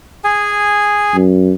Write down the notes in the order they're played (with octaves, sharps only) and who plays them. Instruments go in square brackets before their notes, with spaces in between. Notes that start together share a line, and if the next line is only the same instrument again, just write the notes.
[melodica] G#4 G#5
[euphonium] F#2